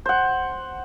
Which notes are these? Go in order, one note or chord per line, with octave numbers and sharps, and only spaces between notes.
C5 F#5